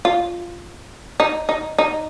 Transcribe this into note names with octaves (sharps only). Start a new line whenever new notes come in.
F4
D#4
D#4
D#4